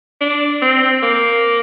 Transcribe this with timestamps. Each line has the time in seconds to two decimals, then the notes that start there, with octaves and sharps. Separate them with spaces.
0.21 D4
0.62 C4
1.02 A#3